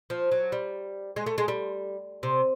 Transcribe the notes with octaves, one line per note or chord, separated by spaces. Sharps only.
F3
F#3
G3
G#3
A3
G#3
G3
C3